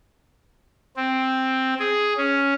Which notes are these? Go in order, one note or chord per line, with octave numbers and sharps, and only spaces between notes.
C4
G#4
C#4